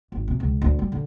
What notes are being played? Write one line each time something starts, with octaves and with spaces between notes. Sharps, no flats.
G#1
C3
C#2
D2
G3
D3